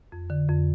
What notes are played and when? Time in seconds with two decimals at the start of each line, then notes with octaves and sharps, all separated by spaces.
0.12 F2
0.30 D3
0.48 F2